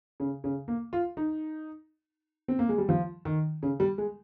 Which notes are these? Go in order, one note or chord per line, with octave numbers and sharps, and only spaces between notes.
C#3
C#3
A#3
F4
D#4
C4
A#3
G#3
G3
F3
D#3
C#3
G3
G#3